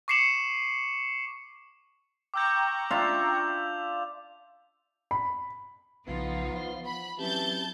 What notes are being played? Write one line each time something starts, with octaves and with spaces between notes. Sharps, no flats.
C#6 D6 C7 C#7 E7 F#7
G5 A#5 C#6 D6 E6 G6
D4 F4 E5 F7
B5
B1 C#3 E3 F3 B3 D#4 F4
C5 F5
F#5 B5
E3 F#3 C4 C#4 G4 A5 G6 A6